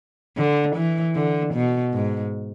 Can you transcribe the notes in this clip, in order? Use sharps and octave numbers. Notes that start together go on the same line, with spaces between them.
D3
E3
D3
B2
G#2